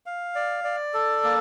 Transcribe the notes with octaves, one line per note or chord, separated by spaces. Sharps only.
F5
D5
D5
A4
A#3